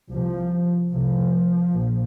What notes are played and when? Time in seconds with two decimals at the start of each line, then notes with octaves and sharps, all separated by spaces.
0.13 C2 C3 F3
0.94 C2 C3 F3
1.74 A#1